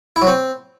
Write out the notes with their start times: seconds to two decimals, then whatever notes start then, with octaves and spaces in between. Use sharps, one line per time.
0.16 E4
0.22 F#3
0.27 C4